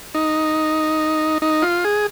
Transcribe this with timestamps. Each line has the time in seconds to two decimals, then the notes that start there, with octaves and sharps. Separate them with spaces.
0.15 D#4
1.42 D#4
1.62 F4
1.84 G#4